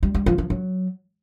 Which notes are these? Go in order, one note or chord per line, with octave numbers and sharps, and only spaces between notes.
G3
G3
F3
F3
F#3